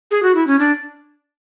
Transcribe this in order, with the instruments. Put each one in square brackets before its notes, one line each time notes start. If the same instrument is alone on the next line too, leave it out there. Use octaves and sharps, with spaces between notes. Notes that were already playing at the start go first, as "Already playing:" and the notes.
[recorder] G#4
F#4
E4
C#4
D4